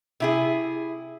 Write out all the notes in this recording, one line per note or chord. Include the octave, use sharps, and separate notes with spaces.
C3 E4 G#4